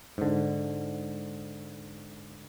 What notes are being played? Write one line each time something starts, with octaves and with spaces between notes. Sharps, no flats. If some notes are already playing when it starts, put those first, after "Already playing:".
G#2 D3